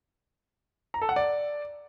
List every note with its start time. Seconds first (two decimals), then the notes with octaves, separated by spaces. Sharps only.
0.94 A#5
1.01 A4
1.09 F#5
1.16 D5